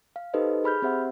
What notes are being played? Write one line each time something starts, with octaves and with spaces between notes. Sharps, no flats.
F5
D#4 G4 A4 B4 C5 D#5
G#4 B5 F6 G6
C4 G4 C5 E5 F#5